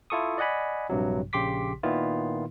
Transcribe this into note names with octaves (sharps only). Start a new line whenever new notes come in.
E4 F4 A4 C#6 D#6
D5 D#5 F#5 G#5 B5
A#1 G2 C3 F#3
A#1 C#3 G4 C6 D6 B6
A#2 D#3 B3 E4 F4